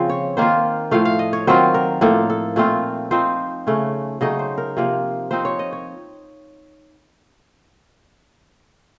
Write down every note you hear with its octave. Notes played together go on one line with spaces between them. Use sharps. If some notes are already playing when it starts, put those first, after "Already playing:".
Already playing: C#3 F3 C4
C#5
D#3 A#3 F4 C5
A2 F3 A3 F5
F5
D#5
C#5
D#3 F#3 C4 F4 C5
A#4
A2 F3 A#3 D#4 A4
A4
A#2 A3 C4 F4
F3 C4 D#4 C5
C#3 A3 C#4
C#3 F#3 A3 D#4 D#5
C5
A#4
C3 F3 A#3
F3 C4 D#4 C5
C#5
D#5
C#5